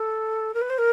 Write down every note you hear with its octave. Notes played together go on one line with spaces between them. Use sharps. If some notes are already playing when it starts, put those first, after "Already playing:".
Already playing: A4
A#4
B4
C5
A#4